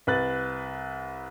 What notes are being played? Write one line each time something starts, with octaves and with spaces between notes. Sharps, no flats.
C2 B4 F#6 A6